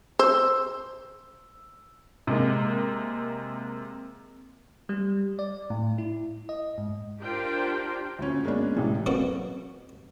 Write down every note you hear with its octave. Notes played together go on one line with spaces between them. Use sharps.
C5 E6
C3 G#3 A#3
G3
D5
A2
E4
D#5
G#2
D4 F4 G4 A#4 C5 G5
D2 A#2 C#4
G#3 A#3 B3 C#4 D4
A1 A2 C3 E3 G#3
F2 B2 F#3 A#3 F#5 C#6